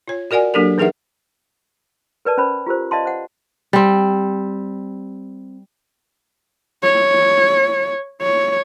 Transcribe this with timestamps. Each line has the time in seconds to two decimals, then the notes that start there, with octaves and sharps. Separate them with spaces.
0.08 F4 C#5
0.31 F#4 A#4 D5 F#5 G#5
0.54 F#3 A#3 D4 G4 A4 A#4
0.78 E3 D#4 G#4 A#4 E5 F#5
2.25 A#4 B4 D5 A5
2.37 C#4 C5 B5
2.66 F4 G4 A#4 C5
2.91 D5 D#5 F5 A5 C6
3.06 C5 F#5
3.73 G3 C4
6.84 C#5
8.22 C#5